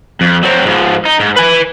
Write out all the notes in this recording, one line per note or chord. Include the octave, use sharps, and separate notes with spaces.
F2
F#3 C4
G#2 F3
D#4
G#2
B4 G#5